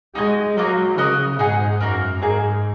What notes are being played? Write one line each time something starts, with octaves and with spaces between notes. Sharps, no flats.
G#3 D#4 F#4 D#5 G#5
F#3 A#3 D#4 F#4 D#5
C#3 F#4 A#4 D#5
G#2 D#4 G#4 D#5 F#5
F#2 A#3 F#4 A#4
G#2 A#3 D#4 G#4